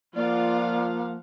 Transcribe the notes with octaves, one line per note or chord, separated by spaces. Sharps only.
F3 A#3 F4 D5 F5 F#5